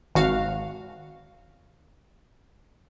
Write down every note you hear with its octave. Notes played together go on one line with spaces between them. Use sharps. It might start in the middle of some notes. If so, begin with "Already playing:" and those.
G#1 F#4 F5